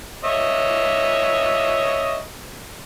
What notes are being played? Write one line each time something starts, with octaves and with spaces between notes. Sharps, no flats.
C#5 D#5 E5